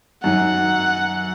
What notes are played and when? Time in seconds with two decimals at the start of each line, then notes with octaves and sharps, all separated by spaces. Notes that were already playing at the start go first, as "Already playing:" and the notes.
0.23 F#2 D#3 F#3 F#5